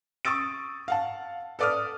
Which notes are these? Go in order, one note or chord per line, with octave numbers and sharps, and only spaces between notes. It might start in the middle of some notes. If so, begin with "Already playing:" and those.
C#6 D#6 E6 A6 D7
F5 F#5 A5
A4 B4 D5 D6 D#6 F6